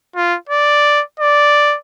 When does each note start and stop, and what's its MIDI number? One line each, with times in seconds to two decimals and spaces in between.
0.16 0.36 65
0.49 1.02 74
1.20 1.76 74